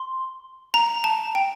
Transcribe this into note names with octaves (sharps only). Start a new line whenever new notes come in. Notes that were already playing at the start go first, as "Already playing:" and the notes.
Already playing: C6
A#5
A5
G5